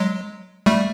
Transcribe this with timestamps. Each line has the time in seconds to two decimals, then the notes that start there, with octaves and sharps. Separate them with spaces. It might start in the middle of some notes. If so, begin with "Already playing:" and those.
Already playing: F#3 G#3
0.66 G3 A3